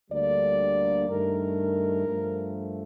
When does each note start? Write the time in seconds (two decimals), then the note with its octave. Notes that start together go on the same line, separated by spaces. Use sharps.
0.10 D2 D3 G3 A#3 D5
1.08 G2 D#3 A3 A#4
2.07 G2 F3 A3